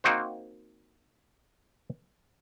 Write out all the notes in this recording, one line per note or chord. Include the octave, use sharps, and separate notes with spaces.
A#3 C4 D#4 F#4 C5